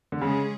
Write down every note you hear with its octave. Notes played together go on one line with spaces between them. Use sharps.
D3
C#3 G#3 C#4 G#4